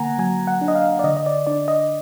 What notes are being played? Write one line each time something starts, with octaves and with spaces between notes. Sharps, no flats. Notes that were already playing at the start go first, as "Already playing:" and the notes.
Already playing: D3 A#3 F#5 G#5 A#5
F#3 G#5
F#5
D4
D#5
F5
D5
D3 D#5
D#5
D5
D4 D5
D#5